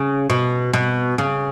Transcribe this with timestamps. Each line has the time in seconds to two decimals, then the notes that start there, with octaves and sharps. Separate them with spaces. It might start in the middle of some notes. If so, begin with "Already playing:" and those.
Already playing: C#3
0.30 B2
0.73 B2
1.18 C#3